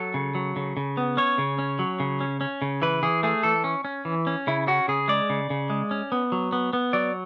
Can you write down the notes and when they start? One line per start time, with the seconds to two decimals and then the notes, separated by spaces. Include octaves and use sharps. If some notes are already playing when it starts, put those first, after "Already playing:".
Already playing: F#3 A4
0.14 C#3
0.35 F#3
0.56 C#3
0.77 C#3
0.97 B3
1.17 C#4 C#5
1.38 C#3
1.59 C#4
1.79 F#3
2.00 C#3
2.21 C#4
2.41 C#4
2.62 C#3
2.82 E3 B4
3.03 E3 G#4
3.23 A3 G#4
3.43 E3 A4
3.64 C#4
3.85 C#4
4.05 E3
4.27 C#4
4.47 C#3 E4
4.67 C#4 F#4
4.88 C#3 G#4
5.08 G#3 D5
5.30 C#3
5.50 C#3
5.70 G#3
5.91 C#4
6.12 B3
6.32 F#3
6.52 B3
6.73 B3
6.93 F#3 D5